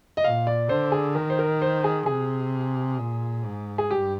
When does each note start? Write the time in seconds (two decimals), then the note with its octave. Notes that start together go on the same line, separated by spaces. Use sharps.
0.17 D#5
0.24 A#2 F5
0.47 D5
0.69 D3 C5
0.92 G#4
1.15 D#3 A#4
1.30 C5
1.39 A#4
1.62 C5
1.84 G#4
2.06 C3 G#4
2.98 A#2
3.44 G#2
3.78 G#4
3.90 G2 G4